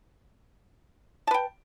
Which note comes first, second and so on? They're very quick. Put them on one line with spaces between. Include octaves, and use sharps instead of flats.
A5 B4 G5